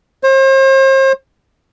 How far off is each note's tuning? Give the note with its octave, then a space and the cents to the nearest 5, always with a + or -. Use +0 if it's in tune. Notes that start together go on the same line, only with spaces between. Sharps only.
C5 +40